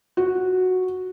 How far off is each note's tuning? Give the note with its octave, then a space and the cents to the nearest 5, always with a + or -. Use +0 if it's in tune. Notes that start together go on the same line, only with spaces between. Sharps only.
F#4 -5